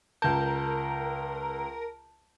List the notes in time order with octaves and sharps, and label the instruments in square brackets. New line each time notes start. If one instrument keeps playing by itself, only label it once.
[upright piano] C#2 G6 [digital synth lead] A#4 [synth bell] A5